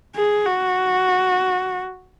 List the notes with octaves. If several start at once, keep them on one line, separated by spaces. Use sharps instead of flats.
G#4
F#4